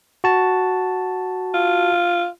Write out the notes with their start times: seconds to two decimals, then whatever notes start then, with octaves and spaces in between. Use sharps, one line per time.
0.24 F#4 A5
1.54 F4